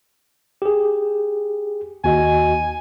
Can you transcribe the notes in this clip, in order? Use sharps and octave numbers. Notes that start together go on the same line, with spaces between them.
G4 G#4
D#2 F#4 D#5 G#5